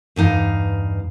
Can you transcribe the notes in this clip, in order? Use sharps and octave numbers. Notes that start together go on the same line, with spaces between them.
E2 G2 D#4 F5